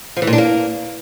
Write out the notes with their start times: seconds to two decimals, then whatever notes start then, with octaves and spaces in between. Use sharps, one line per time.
0.17 F3
0.22 E3
0.27 A#2
0.33 D4
0.38 A#3